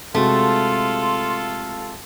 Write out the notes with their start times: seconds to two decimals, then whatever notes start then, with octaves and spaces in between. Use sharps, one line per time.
0.15 C3 G#3 A3 F4 F#4 A4 C6